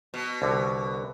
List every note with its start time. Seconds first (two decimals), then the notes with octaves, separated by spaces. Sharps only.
0.14 B2
0.42 C2 D3